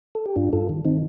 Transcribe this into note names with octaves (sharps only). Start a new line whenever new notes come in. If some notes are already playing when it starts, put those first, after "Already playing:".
A4
G4
G2 D4 F4
G2 F4 A4
D#3
D#3 C4 D#4